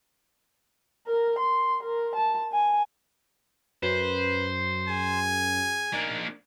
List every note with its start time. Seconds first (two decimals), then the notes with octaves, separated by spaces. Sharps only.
1.07 A#4
1.39 C6
1.83 A#4
2.15 A5
2.52 G#5
3.83 F#2 B4 C5
4.89 G#4 G#5
5.93 A#3 D4 D#4